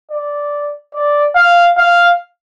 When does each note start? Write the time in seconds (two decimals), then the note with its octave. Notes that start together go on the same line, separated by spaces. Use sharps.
0.11 D5
0.95 D5
1.36 F5
1.77 F5